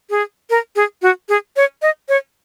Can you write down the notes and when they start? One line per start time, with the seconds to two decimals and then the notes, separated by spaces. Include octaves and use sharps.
0.10 G#4
0.50 A#4
0.76 G#4
1.02 F#4
1.29 G#4
1.56 C#5
1.82 D#5
2.09 C#5